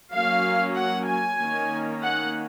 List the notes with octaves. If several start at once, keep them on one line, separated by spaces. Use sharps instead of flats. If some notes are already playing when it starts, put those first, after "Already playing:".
F#3 A#3 C#4 F5
F#5
G#5
D#3 A#3 C#4
F#5